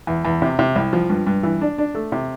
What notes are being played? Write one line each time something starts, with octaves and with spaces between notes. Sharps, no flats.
E2
E2
C3
C3
C2
F3
G2
G2
E3
D4
D4
A3
C3